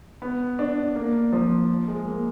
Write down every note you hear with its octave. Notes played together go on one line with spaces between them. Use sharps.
B3
D4
A#3
F3
G#3
A#3